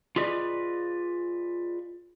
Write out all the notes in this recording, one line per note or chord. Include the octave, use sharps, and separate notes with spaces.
F4 G#4 B4 D5 D#5